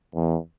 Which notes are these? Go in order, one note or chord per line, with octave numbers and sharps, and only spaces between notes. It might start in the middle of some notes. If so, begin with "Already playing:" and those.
E2